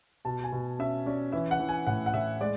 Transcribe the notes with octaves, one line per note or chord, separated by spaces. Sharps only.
B2 A5
G#5
B2
C#4 E5
C#4 D5
E3 E5
F#5
E3
G#5
A2 F#5
F#5
A2 E5
G#3 D5